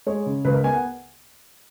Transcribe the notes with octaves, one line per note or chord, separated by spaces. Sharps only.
G#3 C#5
C#3
C#2 B4
A#4
B3 G#5
F#5